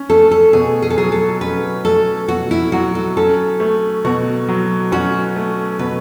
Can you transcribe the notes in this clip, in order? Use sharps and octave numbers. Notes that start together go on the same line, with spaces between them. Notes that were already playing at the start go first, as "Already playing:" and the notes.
Already playing: C#4
A3 A4
A4
B2 G#4
G#4
A4
F#3 G#4
A4
C#4 B4
A3 A4
B2 F#4
E4
F#3 F#4
A4
C#4 A4
A3
B2 F#4
F#3
C#4 F#4
A3
B2 B4